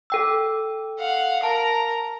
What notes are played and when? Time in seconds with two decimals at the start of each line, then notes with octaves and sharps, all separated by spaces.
0.10 A4 G5 E6
0.99 F5 F#5
1.43 A#4 A5 A#5